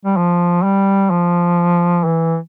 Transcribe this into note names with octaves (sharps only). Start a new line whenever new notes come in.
G3
F3
G3
F3
E3